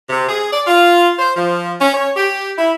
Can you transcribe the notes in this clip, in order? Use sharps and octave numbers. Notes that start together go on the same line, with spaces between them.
C3
G#4
D5
F4
C5
F3
C#4
C#5
G4
E4